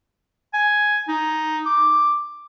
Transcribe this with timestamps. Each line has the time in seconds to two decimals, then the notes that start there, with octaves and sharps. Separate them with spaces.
0.53 G#5
1.08 D#4
1.66 D6